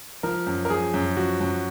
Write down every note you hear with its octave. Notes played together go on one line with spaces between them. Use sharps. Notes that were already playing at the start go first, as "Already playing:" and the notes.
F3 A#4
F#2
A#4
F3 G#4
F#2
F3 F#4
F#2